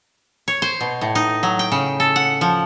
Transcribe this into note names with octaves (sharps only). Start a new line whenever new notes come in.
C#5
C5
B2
A2
D#4
F#3
G5
C#3
A4
F#5
F3